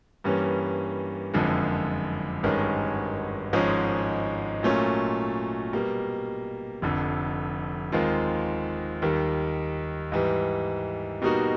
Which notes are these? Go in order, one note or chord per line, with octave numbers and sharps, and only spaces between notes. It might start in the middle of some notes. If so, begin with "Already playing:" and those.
G2 E3 G3 A#3 C#4
F#1 F2 D3 F3 G#3
G#1 G2 D#3 G#3 C#4
G#1 G#2 F3 G#3 C#4
A#2 F#3 A3 C#4 F4
B2 G3 A#3
F1 F2 D3
D#2 D#3 G#3 C4 F4
D#2 D#3 G3
G#2 E3 G3
B2 G3 A#3 D#4 F#4